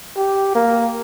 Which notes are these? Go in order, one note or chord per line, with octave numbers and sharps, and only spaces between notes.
G4
A#3